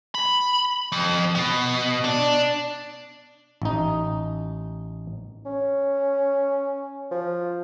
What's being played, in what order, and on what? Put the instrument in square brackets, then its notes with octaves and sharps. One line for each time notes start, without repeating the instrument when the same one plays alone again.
[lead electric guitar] B5
F2
B2
D4
[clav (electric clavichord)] A1 D#4
[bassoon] C#4
F3